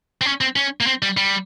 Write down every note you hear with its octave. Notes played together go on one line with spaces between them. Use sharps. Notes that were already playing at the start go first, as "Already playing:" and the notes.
C4
C#4
C4
C#4
A#3
C4
G3
G3